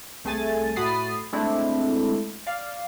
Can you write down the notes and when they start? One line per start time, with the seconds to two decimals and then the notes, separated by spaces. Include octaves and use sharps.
0.25 C2 A3 G#4 G#5 A6
0.76 A2 F#4 B5 D#6 A6 C7
1.33 G#3 A3 C4 D4 E4
2.47 D5 F5